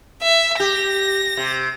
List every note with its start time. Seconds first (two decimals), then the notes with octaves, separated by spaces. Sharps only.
0.22 E5
0.60 G4 A#6
1.37 C3